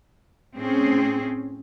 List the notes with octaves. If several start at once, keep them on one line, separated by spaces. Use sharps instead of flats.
A2 C4 C#4 G#4